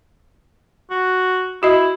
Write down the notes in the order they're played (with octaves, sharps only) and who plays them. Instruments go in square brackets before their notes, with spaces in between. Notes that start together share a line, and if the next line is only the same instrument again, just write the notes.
[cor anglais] F#4
[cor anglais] E4 [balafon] F#4 D#5